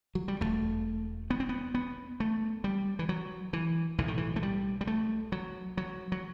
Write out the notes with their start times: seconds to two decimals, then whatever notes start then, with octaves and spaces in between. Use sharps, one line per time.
0.15 F#3
0.28 G3
0.40 E1 D#2 A3
1.30 B3
1.40 C4
1.49 B3
1.75 B3
2.20 A3
2.64 G3
2.99 E3
3.09 F#3
3.53 E3
3.98 B1 A2 E3
4.08 D#3
4.18 E3
4.36 A3
4.43 G3
4.81 G3
4.87 A3
5.32 F#3
5.77 F#3
6.12 F#3